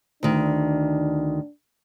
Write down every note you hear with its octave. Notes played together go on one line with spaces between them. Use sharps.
D2 D#3 D4